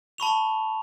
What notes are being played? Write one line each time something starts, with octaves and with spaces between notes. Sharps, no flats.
A5 B5 C#6 F7